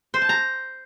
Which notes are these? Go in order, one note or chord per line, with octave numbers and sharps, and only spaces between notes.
C5
A5
A#5